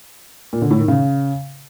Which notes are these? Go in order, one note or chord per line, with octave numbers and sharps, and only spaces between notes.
A#2
D3
A2
D#3
C#3